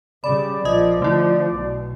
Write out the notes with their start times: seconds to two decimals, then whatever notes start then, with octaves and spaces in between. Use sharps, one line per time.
0.24 C#3 G3 D5 B5
0.65 A#1 F3 D#5 D#6
1.02 D3 F3 A3 E4
1.54 B1 B2